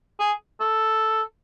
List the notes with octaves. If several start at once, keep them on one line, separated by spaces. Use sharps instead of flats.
G#4
A4